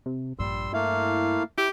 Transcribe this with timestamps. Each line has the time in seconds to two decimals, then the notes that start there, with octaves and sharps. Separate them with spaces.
0.06 C3
0.39 A#1 G2 G3 C6 E6
0.74 A3 A#3 E4 F5
1.58 E4 G4